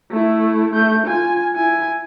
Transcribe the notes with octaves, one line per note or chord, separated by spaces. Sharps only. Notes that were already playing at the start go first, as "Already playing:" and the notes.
A3 E4
A3 G6
F4 G#5
E4 G#5